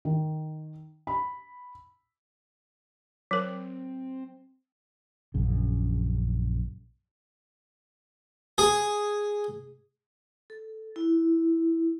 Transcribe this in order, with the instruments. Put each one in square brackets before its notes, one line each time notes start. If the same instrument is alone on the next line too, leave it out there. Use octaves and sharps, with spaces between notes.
[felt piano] D#3
B5
[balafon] F#3 A#4 [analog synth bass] C4
[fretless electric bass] A#1 F#2 C#3
[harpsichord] G#4
[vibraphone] A4
E4